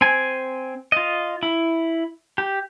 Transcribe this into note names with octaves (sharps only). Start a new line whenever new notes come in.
C4 G#5
F4 D#5
E4
G4